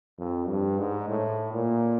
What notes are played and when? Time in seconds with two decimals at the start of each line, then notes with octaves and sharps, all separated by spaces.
0.19 F2
0.48 G2
0.79 G#2
1.09 A2
1.53 A#2